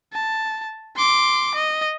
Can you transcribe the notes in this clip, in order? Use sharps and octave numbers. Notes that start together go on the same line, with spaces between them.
A5
C6 D6
D#5